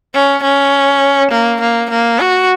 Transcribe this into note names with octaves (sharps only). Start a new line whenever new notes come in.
C#4
C#4
A#3
A#3
A#3
F#4